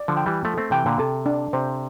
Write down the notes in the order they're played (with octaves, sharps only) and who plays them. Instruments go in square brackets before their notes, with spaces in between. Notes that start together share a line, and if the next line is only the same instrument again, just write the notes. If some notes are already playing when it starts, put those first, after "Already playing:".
Already playing: [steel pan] D5
[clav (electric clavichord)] D3 F3
[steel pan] G5
[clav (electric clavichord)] E3 G3
[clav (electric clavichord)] F3 A3 [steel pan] A4
[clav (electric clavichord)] A3 C4
[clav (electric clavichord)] C3 E3 [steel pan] G5
[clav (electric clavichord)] A#2 D3
[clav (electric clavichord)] C3 [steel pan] A4
[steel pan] D4
[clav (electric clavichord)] C3 [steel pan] C5